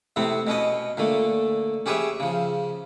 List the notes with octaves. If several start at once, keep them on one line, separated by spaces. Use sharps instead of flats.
A2 C3 B3 C4
B2 C#4 B4 D#5
A#2 D3 A3
C#4 G4 G#4 B4 C#5 E5
C#3 F3